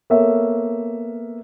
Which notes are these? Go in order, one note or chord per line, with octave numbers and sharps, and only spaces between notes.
A#3 B3 A4 A#4 C#5 E5